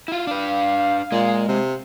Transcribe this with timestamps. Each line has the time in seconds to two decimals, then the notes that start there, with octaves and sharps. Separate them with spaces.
0.08 E4 F4
0.27 D4 B4 F5
1.12 A#2 G#3
1.48 C3